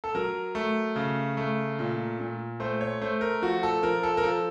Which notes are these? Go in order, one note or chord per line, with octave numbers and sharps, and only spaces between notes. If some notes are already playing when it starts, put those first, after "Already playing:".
A4
F#3 A#4
A3
C#3
A3
A#2
A#2
A3 C5
C#5
A3 C5
A#4
F3 F#4
A4
F3 A#4
A4
A#4
F3 A4